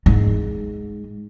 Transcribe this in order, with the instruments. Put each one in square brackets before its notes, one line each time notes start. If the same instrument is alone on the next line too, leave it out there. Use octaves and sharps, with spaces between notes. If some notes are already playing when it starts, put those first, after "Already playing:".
[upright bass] G#2 G#3